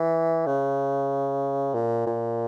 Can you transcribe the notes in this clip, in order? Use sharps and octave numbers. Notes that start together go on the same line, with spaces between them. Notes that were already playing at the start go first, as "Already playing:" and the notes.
Already playing: E3
C#3
A#2
A#2